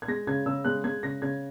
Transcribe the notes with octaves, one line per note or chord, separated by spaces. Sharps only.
G#6
G#3 A#6
C#3 G#6
C#3 E6
G#3 F#6
G#3 G#6
C#3 A#6
C#3 G#6